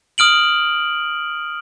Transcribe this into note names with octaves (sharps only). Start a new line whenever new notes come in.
D#6 F6 D7 F#7